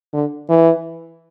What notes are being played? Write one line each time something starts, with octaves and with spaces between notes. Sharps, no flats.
D3
E3